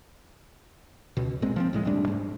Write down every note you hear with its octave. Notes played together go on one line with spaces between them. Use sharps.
C#2 B2
A#1 A#2 G#3 C4
F3 B3 C4
C2 A2 G#3
F#1 G3 A3 D4
G#2